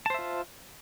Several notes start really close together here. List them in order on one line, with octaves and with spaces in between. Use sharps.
A5 C5 E5 F4